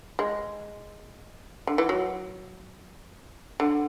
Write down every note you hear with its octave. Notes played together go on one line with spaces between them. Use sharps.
G#3
D3
E3
F#3
D3